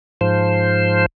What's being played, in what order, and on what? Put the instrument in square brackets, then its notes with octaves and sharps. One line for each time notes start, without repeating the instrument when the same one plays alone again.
[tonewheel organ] G#2 F3 C5